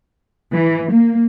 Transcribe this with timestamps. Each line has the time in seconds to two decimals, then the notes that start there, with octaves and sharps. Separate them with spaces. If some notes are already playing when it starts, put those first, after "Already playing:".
0.54 E3
0.92 A#3